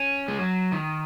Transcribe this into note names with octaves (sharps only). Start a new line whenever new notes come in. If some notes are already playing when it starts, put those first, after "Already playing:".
Already playing: C#4
G#3
F#3
D#3